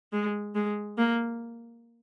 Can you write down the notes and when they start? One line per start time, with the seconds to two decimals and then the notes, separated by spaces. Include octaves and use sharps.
0.12 G#3
0.55 G#3
0.98 A#3